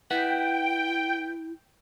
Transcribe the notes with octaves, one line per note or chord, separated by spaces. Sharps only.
E4 B4 E5 F#5 G5